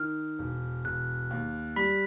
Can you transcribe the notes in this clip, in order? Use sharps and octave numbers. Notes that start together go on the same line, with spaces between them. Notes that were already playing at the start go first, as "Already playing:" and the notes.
Already playing: D#3 F6
E1
E1 F#6
D#2
G3 B5 B6